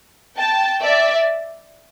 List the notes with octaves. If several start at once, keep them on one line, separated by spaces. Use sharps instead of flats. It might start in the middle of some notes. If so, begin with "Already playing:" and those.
G5 A5
D5 E5